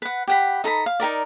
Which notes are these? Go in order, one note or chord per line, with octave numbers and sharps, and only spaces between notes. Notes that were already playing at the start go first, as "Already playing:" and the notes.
B4 F#5
G4 F#5 B5
D#4 A4 A#5 B5
F5
D#4 G4 A#4 D5